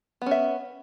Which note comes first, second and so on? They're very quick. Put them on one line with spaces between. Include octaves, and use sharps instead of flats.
B3 C#4 E5